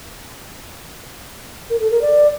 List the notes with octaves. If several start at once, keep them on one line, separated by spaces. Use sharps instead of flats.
A#4
A4
A#4
D5